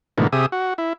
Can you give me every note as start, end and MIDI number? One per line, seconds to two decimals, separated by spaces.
0.18 0.27 44
0.18 0.27 47
0.18 0.27 50
0.18 0.27 52
0.18 0.27 57
0.18 0.27 58
0.32 0.46 48
0.32 0.46 67
0.32 0.46 68
0.32 0.46 76
0.32 0.46 87
0.52 0.74 66
0.78 0.93 64